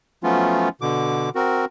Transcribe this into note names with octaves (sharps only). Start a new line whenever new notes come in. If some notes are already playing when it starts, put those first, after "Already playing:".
F3 F#3 A3 B3 C#4 F4
B2 D3 D6
C4 F#4 A#4